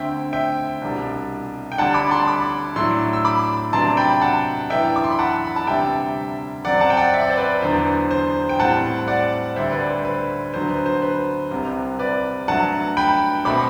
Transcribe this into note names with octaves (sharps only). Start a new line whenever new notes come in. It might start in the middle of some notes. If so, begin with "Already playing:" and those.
Already playing: D2 D3 A3 C4 E5 G5
E5 G5
C2 B2 G3 D4
G5
D2 D3 G3 D4 F#5 A5
B5 D6
A5 C6
B5 D6
A2 F#3 A3 D4 C6 E6
E6
B5 D6
C3 F#3 B3 D4 A5 C6
G5 B5
F#5 A5
F#2 E3 B3 D4 E5 G5
D6
C6
B5
F#5 A5
B5
A5
D2 C3 G3 D4 E5 G5
F#2 F#3 C4 D5 F#5
F#5 A5
G5
D5 F#5
E5
D5
C5
B4 D5
E2 D3 F#3 B3 D4 C5
C5
G5
A2 G3 C4 F#5 A5
D5 F#5
D2 D3 G3 D4 C5 E5
B4 D5
C5
B4
D2 D3 F#3 B3 D4 C5
B4
C5
B4
C2 C3 G3 C4
B4 D5
G2 F#3 A3 F#5 A5
G5 B5
B2 A3 C4 B5 D6